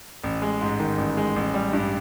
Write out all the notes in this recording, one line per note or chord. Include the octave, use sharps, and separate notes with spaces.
A1
G#3
G#2
D#3
A1
G#3
A1
G3
G2